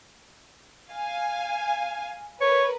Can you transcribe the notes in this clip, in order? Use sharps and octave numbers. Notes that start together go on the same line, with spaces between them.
F5 G#5
A#4 B4 C#5